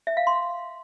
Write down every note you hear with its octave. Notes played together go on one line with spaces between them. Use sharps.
E5
F5
C6